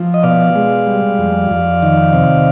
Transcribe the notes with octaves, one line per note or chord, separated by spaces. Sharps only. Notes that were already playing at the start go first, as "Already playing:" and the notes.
Already playing: F3
D#5
B2 D5 F5
G#3
G3
F2
F2
D#3
C3